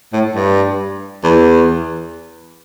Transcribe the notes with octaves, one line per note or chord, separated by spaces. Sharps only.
A2
G2
E2